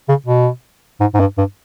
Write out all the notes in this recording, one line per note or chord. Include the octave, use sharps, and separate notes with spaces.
C#3
B2
G#2
G#2
G2
G2